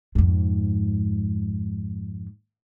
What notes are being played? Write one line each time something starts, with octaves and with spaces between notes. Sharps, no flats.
F2 G#2